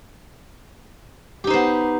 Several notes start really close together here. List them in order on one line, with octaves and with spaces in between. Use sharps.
G4 D#4 C5 B3